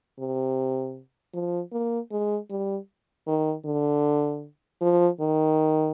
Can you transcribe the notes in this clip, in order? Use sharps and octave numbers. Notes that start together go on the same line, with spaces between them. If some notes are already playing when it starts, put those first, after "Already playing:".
C3
F3
A#3
G#3
G3
D#3
D3
F3
D#3